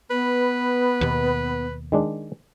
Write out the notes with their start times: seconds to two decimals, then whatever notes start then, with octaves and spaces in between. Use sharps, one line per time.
0.10 B3 B4
1.01 D#2 B2
1.92 D#3 G#3 D4